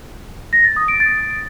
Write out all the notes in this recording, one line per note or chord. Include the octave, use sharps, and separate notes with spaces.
A#6
A6
D#6
D7
A6